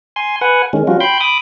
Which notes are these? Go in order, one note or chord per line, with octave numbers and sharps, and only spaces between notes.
G#5 C6
B4 F#5 G#5
D#3 G#3 C#4
F3 G3 C#4 F4 F#4
G5 B5 C6 G6
B5 D6 D#6